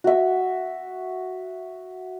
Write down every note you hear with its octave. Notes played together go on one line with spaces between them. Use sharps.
F#4 E5